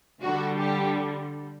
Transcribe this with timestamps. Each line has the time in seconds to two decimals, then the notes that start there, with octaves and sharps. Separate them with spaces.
0.22 D3 G3 F#4
0.60 G4